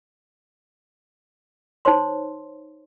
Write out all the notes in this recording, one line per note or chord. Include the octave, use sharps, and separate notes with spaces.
D#4 C5 C#5 C6